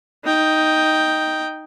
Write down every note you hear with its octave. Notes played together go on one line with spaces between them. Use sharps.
D#4 G5